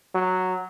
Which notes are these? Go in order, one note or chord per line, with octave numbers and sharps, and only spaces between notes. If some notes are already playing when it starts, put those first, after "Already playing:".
F#3